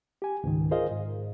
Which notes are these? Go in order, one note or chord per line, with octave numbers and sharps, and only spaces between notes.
G4 G#5
C#2 G#2 D#3
F4 G#4 A#4 C5 D#5 F5
G#2